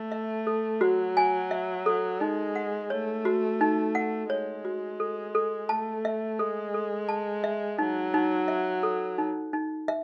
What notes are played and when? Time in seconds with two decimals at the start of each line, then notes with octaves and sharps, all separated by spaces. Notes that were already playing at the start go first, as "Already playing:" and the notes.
Already playing: A3
0.12 E5
0.47 A4
0.81 F#3 F#4
1.17 G#5
1.51 E5
1.86 A4
2.20 G#3 D#4
2.56 F#5
2.90 A3 C#5
3.25 F#4
3.61 D#4
3.95 F#5
4.30 G#3 C#5
4.65 F#4
5.00 A4
5.35 A4
5.69 A3 A5
6.05 E5
6.39 G#3 A4
6.74 A4
7.09 A5
7.44 E5
7.78 F#3 D#4
8.14 D#4
8.48 E5
8.83 A4
9.18 D#4
9.53 D#4
9.88 E5